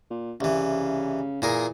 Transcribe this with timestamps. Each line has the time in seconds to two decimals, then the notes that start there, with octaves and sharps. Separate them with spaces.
0.11 A#2
0.41 C2 C#3 E3
1.42 A#2 E3 G#4 A#4